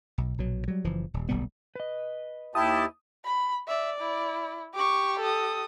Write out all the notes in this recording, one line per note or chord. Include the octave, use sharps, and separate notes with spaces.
B1
A#1 B2 F#3
F#3 G3
F#1 E3 F3
D#1
D1 B1 G3 B3
B4 D#5
D#2 E4 G4 A5 D#6
B5
D5 E5
E4
G4 C#6 D6
A4 D#6